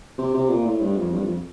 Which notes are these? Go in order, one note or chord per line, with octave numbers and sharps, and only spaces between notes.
C3
C3
A#2
A2
G2
F2
G2
F2